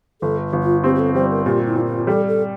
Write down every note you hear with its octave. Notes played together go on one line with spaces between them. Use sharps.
G1 A4
G1
F4
C4 G4
G4
A4
G3 C5
A#4
A#2 G4
E4
A#2
F4
G3 A4
A4